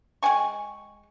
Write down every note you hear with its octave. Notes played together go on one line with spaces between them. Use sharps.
G#3 G5 G#5 C#6